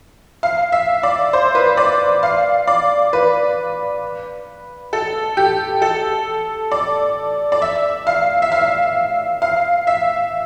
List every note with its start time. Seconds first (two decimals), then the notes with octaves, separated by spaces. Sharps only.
0.43 F5
0.72 E5
1.03 D5
1.33 C5
1.55 B4
1.77 D5
2.23 F5
2.67 D5
3.13 B4
4.93 A4
5.37 G4
5.82 A4
6.72 D5
7.52 D5
7.62 E5
8.07 F5
8.42 E5
8.52 F5
9.42 F5
9.87 E5